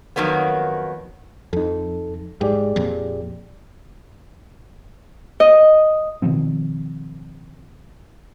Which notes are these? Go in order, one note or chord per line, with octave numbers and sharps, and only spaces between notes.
F2 D#3 F#3 A#3 B3
F2 D#4 A4
G#2 G4 G#4 D5
F2 A#2
D#5
B2 D#3 F3 C4